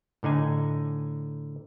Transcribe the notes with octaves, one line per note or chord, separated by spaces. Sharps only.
A2 D3 D#4 G#5